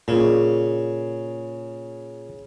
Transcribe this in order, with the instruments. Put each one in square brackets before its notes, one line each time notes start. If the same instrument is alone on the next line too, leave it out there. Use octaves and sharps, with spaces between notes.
[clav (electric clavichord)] A#2 [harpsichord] C#3